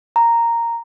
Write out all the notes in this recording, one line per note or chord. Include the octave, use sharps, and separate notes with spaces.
A#5